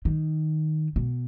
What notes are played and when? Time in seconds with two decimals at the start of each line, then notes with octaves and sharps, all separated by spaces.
0.05 D#3
0.96 B2